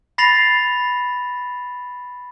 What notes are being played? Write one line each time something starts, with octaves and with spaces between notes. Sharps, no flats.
B5 A6 A#6 C7 F7 F#7